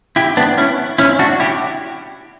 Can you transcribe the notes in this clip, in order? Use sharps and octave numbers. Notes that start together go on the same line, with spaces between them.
E4 G4
B3 D4
C#4 E4
C#4 E4
D4 F#4
E4 G4